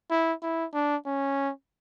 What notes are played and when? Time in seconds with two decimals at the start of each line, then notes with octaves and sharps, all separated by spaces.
0.10 E4
0.42 E4
0.74 D4
1.05 C#4